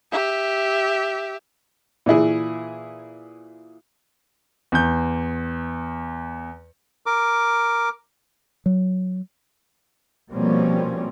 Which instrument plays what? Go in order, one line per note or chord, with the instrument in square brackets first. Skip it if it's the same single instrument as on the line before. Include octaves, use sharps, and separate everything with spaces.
[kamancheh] G4 E5
[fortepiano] A#2 E3 E4 G#4
[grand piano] E2 G6
[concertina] A#4 D6
[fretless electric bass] F#3
[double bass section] B2 F3 G3 A#3 C4 C#4